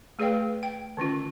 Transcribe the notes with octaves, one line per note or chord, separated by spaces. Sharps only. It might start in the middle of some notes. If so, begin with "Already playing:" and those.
A3 G#4 B4 D5 F5 G5
G5
D3 D#3 C#4 F4